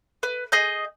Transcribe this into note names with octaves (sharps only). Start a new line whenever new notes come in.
B4
G#4 D#5 G6